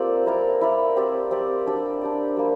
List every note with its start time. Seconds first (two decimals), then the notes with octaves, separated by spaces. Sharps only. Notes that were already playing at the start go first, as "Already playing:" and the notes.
Already playing: A#3 C4 F4 G4 A4 D5
0.26 E4 A#4 D5
0.61 E4 A#4 D5
0.96 C4 G4 D5
1.31 C4 G4 D5
1.66 D4 G4 D5
2.01 D4 G4 D5
2.37 G3 A#3